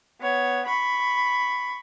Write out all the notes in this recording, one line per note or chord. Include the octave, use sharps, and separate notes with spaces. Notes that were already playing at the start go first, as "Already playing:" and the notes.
B3 C#5
B5 C#6